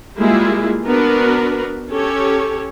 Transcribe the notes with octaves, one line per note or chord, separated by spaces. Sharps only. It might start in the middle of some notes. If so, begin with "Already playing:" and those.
G3 G#3 A#3 E4 F4 G#4
B3 D4 F#4 A#4 B4
C#4 G4 A4 C#5